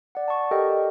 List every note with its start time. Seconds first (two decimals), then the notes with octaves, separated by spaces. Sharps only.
0.15 D5 F#5
0.28 A5 C#6
0.51 G4 A4 A#4 D#5 G5